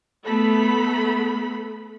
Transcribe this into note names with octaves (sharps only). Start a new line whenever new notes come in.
A3 B3 A4 B5